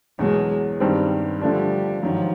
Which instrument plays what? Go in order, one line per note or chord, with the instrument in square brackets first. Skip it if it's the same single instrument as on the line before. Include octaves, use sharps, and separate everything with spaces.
[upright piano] E2 B2 F#3 [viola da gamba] G#3
[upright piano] G2 D#3 G3 C4
[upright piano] D3 F3 A3 D4 [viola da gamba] G3
[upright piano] G#2 D#3 F#3 [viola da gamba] F3